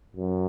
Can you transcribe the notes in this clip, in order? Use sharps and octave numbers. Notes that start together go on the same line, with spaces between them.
F#2